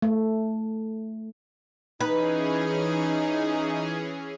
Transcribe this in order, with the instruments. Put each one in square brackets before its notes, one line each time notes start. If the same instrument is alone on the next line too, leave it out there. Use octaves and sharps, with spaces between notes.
[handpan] A3
[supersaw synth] E3 C#4 G#4 [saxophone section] D#4 [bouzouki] B4